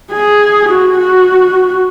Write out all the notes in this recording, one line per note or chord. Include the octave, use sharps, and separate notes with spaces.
G#4
F#4
F#4